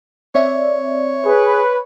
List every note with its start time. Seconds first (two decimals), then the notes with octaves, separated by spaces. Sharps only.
0.35 C4 C#5 D5 E5
1.25 G#4 B4